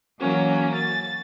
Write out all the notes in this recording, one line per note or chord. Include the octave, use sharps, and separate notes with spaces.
E3 F#3 A#3 C#4
A6